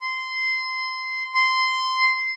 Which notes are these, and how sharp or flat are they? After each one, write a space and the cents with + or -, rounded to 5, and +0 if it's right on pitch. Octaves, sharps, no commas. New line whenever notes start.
C6 -15
C6 -10